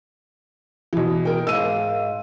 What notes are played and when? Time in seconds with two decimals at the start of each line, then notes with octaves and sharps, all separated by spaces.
0.93 B2 E3
1.25 A#4 G5
1.47 G#2 F5 E6 D#7